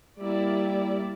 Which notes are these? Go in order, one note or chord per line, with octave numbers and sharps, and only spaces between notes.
G3 A#3 E4 D5